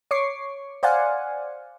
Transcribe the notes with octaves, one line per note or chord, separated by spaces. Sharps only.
C#5 C#6 D6 C7
C5 D5 F5 F#5 G#5